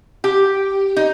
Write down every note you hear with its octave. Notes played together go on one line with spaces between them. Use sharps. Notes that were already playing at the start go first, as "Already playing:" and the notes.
G4
D#4